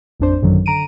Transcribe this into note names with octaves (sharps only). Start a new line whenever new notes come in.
A1 F2 D4 C5
A1 F#2 D3 D#3 F#3
D3 A#5 D7 D#7